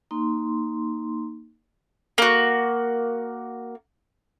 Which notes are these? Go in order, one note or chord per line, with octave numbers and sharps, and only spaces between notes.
A#3 D#4 C6
A#3 F#4